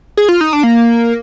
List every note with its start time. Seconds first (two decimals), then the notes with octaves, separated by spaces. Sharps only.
0.17 G#4
0.29 F4
0.41 D#4
0.53 D4
0.63 A#3